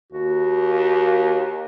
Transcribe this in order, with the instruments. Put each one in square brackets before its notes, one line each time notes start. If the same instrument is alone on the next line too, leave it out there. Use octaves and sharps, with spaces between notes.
[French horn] D#2 [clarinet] F#4